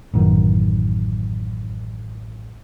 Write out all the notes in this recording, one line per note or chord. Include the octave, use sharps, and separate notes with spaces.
A1 F#2 D#3